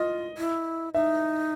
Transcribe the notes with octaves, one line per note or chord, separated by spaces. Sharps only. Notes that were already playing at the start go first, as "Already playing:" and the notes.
Already playing: F4 D#5
E4
D#4 E5